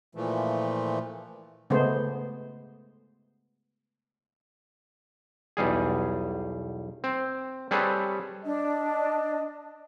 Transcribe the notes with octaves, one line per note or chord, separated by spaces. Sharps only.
A#2 E3 F3 A3
C#3 G#3 A3 B3 C5
B1 E2 G3 G#4
C4
G3 C4 G#4 A4 B4 C#5
D4 D#5